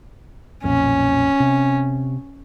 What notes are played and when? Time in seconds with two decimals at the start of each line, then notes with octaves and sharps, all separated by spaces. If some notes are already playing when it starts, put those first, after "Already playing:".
0.64 B1 F2 A#2 C#4
1.40 C3